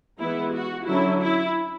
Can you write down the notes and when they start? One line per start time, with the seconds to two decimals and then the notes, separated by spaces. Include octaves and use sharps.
0.20 E3 G#3 B3 E4
0.54 F#4
0.87 D3 F#3 C#4 E4
1.22 E4